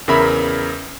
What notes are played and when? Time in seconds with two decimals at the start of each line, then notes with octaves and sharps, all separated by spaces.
0.08 E2 C#3 A#4 E5 B5